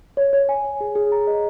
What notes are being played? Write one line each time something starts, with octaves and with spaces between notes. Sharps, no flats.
C#5
C#5
G#5
C#5
G#4
G#4
A#5
D#5